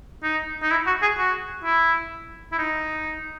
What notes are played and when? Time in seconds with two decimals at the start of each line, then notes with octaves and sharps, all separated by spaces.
0.23 D#4
0.63 D#4
0.71 E4
0.87 F#4
1.02 G#4
1.18 F#4
1.64 E4
2.52 E4
2.58 D#4